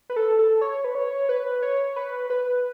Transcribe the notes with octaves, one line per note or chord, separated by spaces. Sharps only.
B4
A4
A4
C#5
B4
C#5
B4
C#5
B4
B4